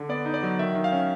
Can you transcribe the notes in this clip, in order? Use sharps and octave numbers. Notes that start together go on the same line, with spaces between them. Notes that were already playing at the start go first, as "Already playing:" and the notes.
Already playing: D3
B3 D5
D#4
D5
F#3
D#3 E5
D#3
F5
C#4